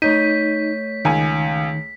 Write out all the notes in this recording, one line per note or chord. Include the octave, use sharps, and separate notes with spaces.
A3 D#4 C#5 G6 B6 D#7
C#2 D#3 G#5